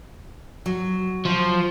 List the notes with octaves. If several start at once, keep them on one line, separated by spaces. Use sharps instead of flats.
F#3
F3